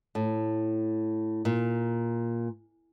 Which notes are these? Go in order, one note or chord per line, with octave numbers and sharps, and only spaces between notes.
A2
A#2